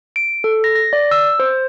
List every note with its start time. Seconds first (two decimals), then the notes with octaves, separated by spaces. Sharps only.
0.16 D7
0.44 A4
0.64 A#6
0.75 A#6
0.93 D5
1.11 E6
1.40 C5